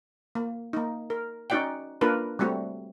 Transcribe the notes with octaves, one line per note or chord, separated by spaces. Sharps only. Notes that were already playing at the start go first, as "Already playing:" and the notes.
A#3
A#3 D#4
A#4
C#4 D#4 F#4 D5 F#5 G5
A#3 D4 F4 A#4 B4
G3 A3 C4 F#4